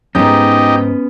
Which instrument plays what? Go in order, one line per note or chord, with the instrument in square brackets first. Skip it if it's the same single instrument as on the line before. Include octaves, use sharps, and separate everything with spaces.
[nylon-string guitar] F2 G#2 [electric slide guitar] B3 C#4 [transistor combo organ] D#4 G4